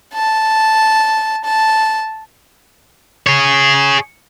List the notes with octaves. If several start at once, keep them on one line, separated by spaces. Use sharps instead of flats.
A5
A5
G#4 C#5